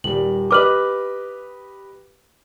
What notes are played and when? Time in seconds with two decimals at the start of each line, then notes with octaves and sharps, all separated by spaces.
0.04 D#1 G3 F#7
0.51 G4 B4 D#5 D6 F6 F#7